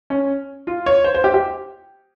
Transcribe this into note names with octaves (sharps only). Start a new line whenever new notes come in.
C#4
F4
C#5
C5
C5
G4
G4